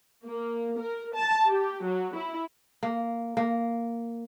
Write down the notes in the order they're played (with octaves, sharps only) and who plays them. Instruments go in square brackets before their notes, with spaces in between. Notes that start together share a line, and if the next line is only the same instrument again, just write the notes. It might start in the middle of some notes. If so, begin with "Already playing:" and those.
[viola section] A#3
A#4
A5
G4
F#3
E4
[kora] A#3
A#3